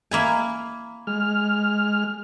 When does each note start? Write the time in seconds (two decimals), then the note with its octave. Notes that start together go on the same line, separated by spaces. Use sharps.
0.11 A#3 E4 G#5
1.07 G#3 F6